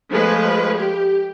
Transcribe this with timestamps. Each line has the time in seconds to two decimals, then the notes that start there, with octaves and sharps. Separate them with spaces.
0.11 F3 G#3 A3 B4
0.76 G4